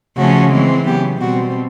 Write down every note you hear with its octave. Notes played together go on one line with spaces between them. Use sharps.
C#3 F3 A3 C#4 F#4
E3 G#3 C4
C#3 F#3 B3 G4
B2 G3 C4 F#4